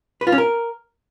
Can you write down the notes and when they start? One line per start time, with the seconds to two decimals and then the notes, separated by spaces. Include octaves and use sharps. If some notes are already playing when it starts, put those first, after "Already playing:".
0.21 B4
0.27 F4
0.32 C#4
0.38 A#4